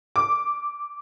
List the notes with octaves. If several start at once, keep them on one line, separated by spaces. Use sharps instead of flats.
D6